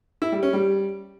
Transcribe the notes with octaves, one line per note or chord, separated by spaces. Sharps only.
E4
G3
C#4
G3